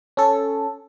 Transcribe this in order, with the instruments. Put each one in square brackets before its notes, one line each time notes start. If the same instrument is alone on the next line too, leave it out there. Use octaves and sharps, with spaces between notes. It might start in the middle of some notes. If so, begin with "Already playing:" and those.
[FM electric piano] C#4 A4